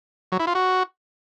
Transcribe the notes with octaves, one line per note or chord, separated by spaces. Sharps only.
F#3
E4
F4
F#4